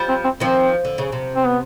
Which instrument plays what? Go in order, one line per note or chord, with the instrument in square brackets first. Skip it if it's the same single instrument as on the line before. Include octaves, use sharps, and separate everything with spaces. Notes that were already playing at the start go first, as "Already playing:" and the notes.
Already playing: [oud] F3 G3
[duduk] C4
C4
[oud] D#3 F3 [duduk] C4
[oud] D3
C#3
C3
[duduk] C4
B3